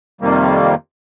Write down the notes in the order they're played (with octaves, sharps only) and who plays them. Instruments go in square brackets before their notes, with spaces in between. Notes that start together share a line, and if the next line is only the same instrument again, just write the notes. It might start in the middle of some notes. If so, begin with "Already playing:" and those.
[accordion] F2 C3 D#3 G3 A#3